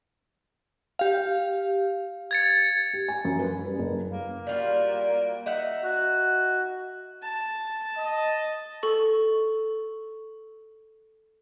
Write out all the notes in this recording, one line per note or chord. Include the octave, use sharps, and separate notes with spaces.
G4 F5
G#6 A6 C#7
G4
G#5
F#2
B4
G3
F#1
A#3
G3 F4 F#4
D#4 E5 F#5
F#4
A5
D#5
A4 C#6